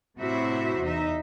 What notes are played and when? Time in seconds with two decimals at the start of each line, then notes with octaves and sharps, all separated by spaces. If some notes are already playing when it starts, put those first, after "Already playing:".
0.19 A2 C3 E4 F#4 C5 E5
0.83 E2 D#4 E5